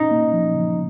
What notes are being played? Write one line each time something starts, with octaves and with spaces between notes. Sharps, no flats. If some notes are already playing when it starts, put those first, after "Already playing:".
Already playing: C#4 D#4
A#3
F3
C#3